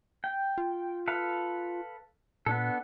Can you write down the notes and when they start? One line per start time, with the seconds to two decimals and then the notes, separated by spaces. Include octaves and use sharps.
0.24 G5
0.58 F4
1.08 A4 B4 F5
2.46 A#2 B3 D4 A4